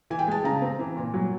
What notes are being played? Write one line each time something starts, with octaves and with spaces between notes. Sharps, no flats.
E3 G#5
G5
G#3 A5
C#3 A#5
C4
E3
A#2
F#3